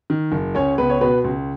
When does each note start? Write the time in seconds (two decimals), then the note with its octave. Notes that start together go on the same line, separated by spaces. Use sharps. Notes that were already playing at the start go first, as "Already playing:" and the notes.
0.10 D#3
0.32 F#1
0.55 C#2 C#4 C#5
0.78 C#2 B3 B4
0.90 C#5
1.01 B2 B3 B4
1.24 C#2